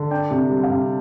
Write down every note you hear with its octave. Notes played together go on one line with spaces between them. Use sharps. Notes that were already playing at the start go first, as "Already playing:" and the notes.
Already playing: D3
D4 G5
C3
G3
F5
C3